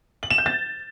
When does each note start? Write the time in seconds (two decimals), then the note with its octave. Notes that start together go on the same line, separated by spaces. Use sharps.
0.23 F#7
0.30 E7
0.38 G6
0.46 A6